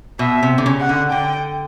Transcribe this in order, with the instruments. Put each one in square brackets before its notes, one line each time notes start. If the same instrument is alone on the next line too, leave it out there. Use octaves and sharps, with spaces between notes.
[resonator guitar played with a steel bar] B2 [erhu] E5
[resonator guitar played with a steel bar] C3
D3
C#3
[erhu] F#5
[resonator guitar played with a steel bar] D3
[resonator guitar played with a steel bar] D3 [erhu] G5